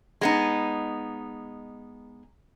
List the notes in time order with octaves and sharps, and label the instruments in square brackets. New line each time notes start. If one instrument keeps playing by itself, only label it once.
[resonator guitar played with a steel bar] G#3 B3 D#4